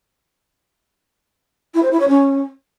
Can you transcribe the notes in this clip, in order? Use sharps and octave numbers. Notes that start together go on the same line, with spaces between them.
E4
C5
E4
C#5
C#4